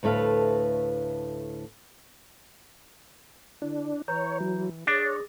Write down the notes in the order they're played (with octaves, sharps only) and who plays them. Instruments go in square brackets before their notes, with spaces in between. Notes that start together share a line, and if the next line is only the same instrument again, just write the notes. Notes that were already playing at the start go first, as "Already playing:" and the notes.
[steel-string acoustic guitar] D2 A2 A3 B4 F5
[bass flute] D3 [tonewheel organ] D4 [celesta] E4
[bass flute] E3 [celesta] B4 A#5 G6 [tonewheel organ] C#5
[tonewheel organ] F#3
[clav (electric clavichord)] D4 [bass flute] G#4 [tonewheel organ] C#5 [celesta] D6 A6 A#6